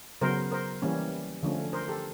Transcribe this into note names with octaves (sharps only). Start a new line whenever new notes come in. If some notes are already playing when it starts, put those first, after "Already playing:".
C#3 F#3 B3 A#4 C5
A#4 C5
E3 G3 A#3 C#4
D3 F3 A3 C#4
A#4 C5
G4 A4